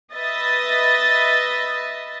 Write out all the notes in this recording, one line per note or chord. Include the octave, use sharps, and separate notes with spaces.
B4 D#5 E5 D#6 A6